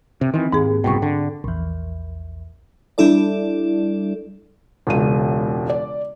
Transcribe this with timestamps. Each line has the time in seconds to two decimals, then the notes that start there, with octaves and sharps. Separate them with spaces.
0.21 C3
0.34 D#3 E3 C4
0.52 D#2 G#2 G#4
0.84 F#1 C2 B2 G5 C#6
1.02 D3
1.44 A#1 E2
2.98 G3 D4 E4 A4 D5
4.87 E1 C#2 D#7
5.70 D5